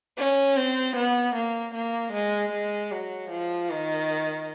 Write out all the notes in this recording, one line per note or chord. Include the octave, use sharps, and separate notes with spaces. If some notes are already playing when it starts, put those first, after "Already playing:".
C#4
C4
B3
A#3
A#3
G#3
G#3
F#3
F3
D#3